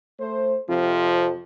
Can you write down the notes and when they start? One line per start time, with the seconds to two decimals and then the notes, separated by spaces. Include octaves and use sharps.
0.19 A3 C5
0.68 F2 C3 F3